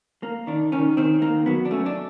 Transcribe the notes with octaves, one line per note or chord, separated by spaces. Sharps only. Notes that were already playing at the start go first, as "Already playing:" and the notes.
A#3
D#3 D4
D#3 C#4
D#3 C4
D#3 A#3
F#3 B3
D4
A3 C#4
D4